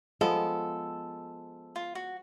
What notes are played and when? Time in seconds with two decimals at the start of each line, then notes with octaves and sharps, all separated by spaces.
0.21 F3 G#3 B3 A4
1.76 F4
1.95 F#4